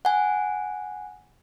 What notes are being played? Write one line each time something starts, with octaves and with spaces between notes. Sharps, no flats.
F#5 G#5